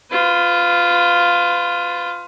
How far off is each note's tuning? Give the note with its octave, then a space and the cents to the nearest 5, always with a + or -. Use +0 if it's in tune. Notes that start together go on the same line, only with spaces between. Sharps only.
F4 +0 B4 +35